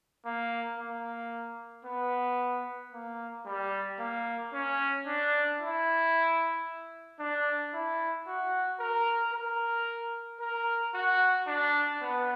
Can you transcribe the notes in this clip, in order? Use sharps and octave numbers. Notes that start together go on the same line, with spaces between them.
A#3
A#3
B3
A#3
G3
A#3
C#4
D4
E4
D4
E4
F#4
A#4
A#4
A#4
F#4
D4
B3